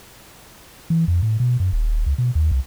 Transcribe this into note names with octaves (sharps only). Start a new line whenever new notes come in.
E3
F2
A2
B2
F#2
D#1
C#2
B2
D#2
C2